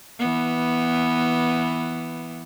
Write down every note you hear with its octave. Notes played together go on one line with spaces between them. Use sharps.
E3 B3